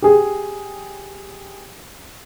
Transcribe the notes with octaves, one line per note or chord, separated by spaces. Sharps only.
G4 G#4